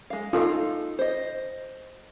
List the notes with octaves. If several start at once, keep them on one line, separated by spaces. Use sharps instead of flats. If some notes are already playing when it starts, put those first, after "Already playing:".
G#3 F5
D#4 F4 A4 F5
C5 D#5